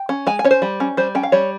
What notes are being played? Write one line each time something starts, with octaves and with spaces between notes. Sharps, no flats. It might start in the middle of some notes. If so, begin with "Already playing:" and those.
Already playing: G5
C#4
G#3 G#5
G#5
C#4 C#5
C5
G3
C#4
G3 C5
C#4 G5
F5
G3 C#5